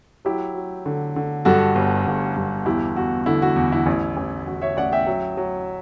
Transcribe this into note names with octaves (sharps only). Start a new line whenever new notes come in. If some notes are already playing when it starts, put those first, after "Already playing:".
F#3 E4 G4
F#3
D3
D3
G2 F#4 A4
G1
G1
G2
E2 E4 G4
E2 F#4
D3 E4
F#4
E2
E4
A1
A1
A1 F#4
C#5 E5
A1 D5 F#5
E5 G5
F#3
F#3